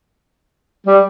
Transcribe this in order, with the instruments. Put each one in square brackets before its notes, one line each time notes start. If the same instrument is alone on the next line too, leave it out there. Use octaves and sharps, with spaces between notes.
[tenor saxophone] G3